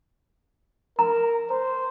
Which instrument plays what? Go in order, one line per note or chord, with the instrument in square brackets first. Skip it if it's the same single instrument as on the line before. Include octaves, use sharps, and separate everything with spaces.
[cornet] A#4 [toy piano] A#5
[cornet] C5 [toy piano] A#5